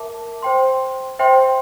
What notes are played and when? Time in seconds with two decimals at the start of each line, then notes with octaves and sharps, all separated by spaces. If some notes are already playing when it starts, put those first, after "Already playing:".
Already playing: A#4 E5 A5 D6
0.42 C5 G5 C6
1.19 C5 E5 G5 C6